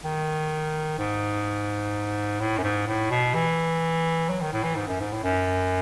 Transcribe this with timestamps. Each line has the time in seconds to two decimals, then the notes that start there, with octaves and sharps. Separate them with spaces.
0.04 D#3
0.98 G#2
2.40 A2
2.58 F#2
2.63 G#2
2.87 A2
3.11 B2
3.34 E3
4.29 F#3
4.41 D#3
4.53 A2
4.64 E3
4.76 G#2
4.87 F#2
5.00 G#2
5.12 A2
5.23 F#2